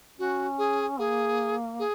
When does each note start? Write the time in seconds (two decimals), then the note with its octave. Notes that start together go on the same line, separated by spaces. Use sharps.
0.18 C#4 F#4
0.58 G#4
0.99 A#3 G#4
1.79 G#4